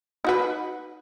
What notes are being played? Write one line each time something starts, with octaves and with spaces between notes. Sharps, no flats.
D#4 F#4 B4